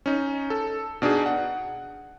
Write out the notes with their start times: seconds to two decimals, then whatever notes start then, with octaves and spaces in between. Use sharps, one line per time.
0.06 C#4 D#4
0.50 A4
1.02 B2 D4 D#4 G#4
1.26 F#5